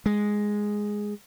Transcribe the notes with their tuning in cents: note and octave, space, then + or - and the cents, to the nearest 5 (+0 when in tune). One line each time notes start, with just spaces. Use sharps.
G#3 +0